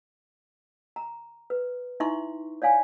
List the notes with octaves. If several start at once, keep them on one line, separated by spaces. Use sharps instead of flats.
A#5
B4
D#4 E4 E5 C6 C#6
C#5 D5 F5 G#5